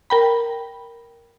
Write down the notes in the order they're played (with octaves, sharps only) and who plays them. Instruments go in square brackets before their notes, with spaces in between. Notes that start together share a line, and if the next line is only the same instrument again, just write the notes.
[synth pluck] A#4 G5 B5